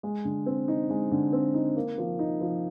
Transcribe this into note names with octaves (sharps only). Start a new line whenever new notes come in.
G#3
D3
C4
D#4
G#3
D3
C4
D#4
A#3
F3
D#4
F3